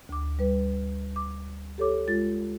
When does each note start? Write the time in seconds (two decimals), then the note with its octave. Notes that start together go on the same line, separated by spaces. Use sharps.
0.09 D2 D6
0.39 G3 B4
1.16 D6
1.78 G4 A4 C#5 D6
2.08 G#3 F4 A6